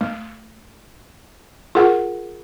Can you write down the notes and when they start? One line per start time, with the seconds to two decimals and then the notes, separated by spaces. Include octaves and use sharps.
0.01 A3
1.75 F4 G#4 A#4 F#5